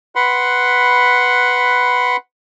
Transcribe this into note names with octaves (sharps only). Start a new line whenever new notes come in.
B4 F#5 B5 C6